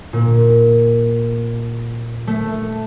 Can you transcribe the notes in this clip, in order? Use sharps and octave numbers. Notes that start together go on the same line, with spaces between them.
A#2
A3